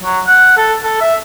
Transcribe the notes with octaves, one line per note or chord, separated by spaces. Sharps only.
F#3
F#5
A4
A4
E5